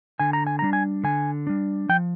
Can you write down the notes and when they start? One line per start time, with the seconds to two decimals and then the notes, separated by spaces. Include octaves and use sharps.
0.20 D3 G#5
0.33 A#5
0.47 G#5
0.59 G3 D4 A#5
0.73 G#5
1.04 D3 G#5
1.47 G3 D4
1.89 F3 G5